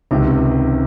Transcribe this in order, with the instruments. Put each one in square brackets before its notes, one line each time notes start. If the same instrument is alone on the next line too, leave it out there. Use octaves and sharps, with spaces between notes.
[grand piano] C#2 C3 D#3 [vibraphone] C#4